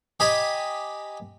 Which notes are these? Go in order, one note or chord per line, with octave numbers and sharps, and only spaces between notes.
G4 D#5 G#5 A#5 B5 D#6